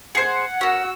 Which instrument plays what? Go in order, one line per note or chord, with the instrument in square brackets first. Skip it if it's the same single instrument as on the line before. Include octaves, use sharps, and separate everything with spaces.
[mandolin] G#4 C5 [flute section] F#5 [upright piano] G#6 C7 C#7
[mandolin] C#4 A#4 [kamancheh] F#4 E6